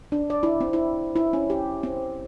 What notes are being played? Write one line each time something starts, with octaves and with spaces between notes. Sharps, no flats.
D4
D5
E4
C4
E4
E4
C#4
G4
C4